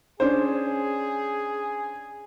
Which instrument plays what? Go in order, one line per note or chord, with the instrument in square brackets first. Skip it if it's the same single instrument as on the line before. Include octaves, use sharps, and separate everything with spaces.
[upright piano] C#4 D4 C5 [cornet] G#4